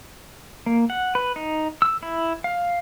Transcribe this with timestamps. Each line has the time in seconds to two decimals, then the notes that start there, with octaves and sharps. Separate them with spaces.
0.66 A#3
0.90 F#5
1.15 B4
1.36 D#4
1.82 E6
2.03 E4
2.44 F5